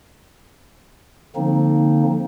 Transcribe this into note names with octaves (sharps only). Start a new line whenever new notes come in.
D3 F3 A#3 C4 D#4